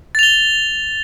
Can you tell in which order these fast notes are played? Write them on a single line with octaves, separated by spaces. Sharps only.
A6 F7 G7